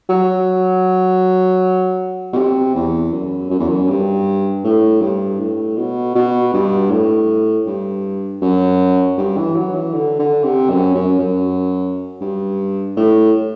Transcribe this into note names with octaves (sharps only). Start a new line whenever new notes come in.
F#3
B2
C3
E2
F#2
F#2
E2
F#2
G2
A2
G2
A2
B2
B2
G2
A2
G2
F#2
G2
E3
F#3
E3
D3
D3
C3
F#2
F#2
F#2
G2
A2